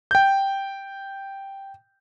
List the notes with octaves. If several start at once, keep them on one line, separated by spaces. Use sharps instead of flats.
G5 G6